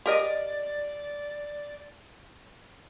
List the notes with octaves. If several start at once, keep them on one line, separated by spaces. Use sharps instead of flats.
G4 A#4 D5 D#5